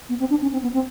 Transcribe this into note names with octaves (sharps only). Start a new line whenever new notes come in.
B3
C4
D4
C#4
C4
B3
C4